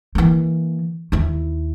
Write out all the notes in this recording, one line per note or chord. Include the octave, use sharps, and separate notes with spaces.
E3 A#3
D#2 E4